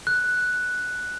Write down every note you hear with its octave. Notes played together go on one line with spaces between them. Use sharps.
F#6